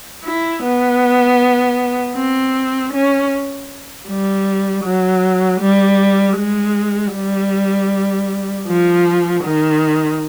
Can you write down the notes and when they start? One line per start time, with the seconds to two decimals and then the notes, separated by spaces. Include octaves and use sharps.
0.24 E4
0.63 B3
2.16 C4
2.93 C#4
4.08 G3
4.84 F#3
5.60 G3
6.37 G#3
7.14 G3
8.67 F3
9.44 D#3